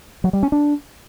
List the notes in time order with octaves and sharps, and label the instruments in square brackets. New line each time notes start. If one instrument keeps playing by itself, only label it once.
[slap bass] F#3
G3
C#4
D4